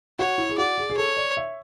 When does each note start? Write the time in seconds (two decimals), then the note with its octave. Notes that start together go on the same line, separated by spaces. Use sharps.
0.19 F#4 C#5
0.38 E4
0.49 G#4
0.58 F#4 D5
0.78 G#4
0.90 G#4
0.97 A4 C#5
1.17 D5
1.37 E5